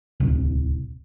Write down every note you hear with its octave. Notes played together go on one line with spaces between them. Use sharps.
D1 C2